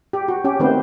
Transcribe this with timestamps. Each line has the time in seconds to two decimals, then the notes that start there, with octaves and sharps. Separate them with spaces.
0.13 G4
0.28 F#4
0.44 C#4 G4
0.60 D#3 A3 B3 C4 C5